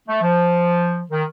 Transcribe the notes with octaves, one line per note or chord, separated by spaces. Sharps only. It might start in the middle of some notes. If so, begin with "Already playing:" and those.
A3
F3
D#3